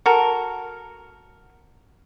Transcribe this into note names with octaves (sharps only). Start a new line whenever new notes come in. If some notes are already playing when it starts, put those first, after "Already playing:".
F#4 A4 A#4